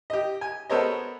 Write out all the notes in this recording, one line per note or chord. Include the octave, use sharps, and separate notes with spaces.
G4 D#5
G#5
B3 A4 A#4 C5 C#5 D#5